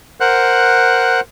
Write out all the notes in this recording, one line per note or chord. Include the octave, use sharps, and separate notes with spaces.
A#4 C5 F#5 F#6